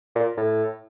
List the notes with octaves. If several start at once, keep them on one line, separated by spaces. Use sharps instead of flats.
A#2
A2